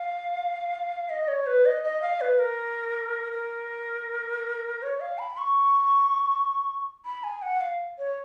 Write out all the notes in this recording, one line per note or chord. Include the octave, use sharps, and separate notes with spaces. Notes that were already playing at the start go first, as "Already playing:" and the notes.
Already playing: F5
D#5
C#5
B4
D#5
D#5
F5
B4
A#4
A#4
C#5
F5
B5
C#6
B5
G#5
F#5
F5
C#5